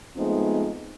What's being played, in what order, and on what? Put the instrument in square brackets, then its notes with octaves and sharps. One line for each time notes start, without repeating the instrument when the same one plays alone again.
[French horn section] F3 G#3 A3 B3 C4 D#4